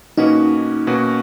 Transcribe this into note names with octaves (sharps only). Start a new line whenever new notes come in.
B2 A#3 C#4 D#4 F#4 B4
B2 A#3 C#4 F#4 B4